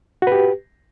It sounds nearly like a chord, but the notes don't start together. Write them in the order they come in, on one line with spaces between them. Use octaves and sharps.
F#4 B4 G4